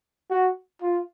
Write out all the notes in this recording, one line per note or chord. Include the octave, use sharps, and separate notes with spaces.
F#4
F4